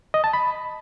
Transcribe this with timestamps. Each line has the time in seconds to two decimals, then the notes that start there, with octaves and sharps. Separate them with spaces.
0.14 D#5
0.24 A5
0.33 B5